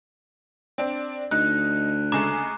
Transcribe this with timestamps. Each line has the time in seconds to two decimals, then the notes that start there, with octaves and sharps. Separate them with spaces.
0.78 C4 D4
1.31 D2 D#4 F#6
2.12 C#3 G#3 A3 A#5 D6